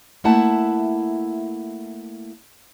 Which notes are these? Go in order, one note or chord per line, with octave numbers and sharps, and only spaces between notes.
A3 A#3 E4 E5 F#5 A5